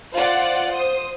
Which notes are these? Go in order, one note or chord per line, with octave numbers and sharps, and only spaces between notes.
F4 C5 D5 F#5
C5 D#6